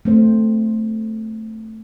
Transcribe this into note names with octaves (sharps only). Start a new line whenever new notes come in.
A3 C4 C5